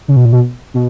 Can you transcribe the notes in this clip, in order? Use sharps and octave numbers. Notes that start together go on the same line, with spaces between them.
C#3
B2
A#2
B2
B2